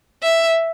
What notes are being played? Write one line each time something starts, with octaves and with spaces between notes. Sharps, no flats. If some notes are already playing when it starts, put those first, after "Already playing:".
E5